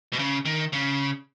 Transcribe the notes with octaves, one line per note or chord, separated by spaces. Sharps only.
B2
C#3
D#3
C#3